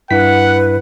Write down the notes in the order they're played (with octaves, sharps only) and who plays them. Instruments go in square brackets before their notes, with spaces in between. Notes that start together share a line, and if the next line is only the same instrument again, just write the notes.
[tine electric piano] G2 E4 B6 [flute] B4 [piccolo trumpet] F#5